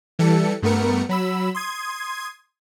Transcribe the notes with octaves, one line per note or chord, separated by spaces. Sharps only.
E3 G3 A4 C#7
G2 A3 B3 A#4 C#7
F#3 B5 E6
C6 D#6 G#6